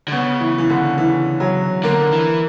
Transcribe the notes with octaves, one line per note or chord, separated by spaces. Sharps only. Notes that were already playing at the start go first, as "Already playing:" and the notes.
D3
C#3 B3
E3
E3
D3
E3
F#3
D3 A#3
E3